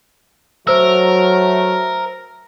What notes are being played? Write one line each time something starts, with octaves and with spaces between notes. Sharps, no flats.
F#3 A3 A#4 C5 E6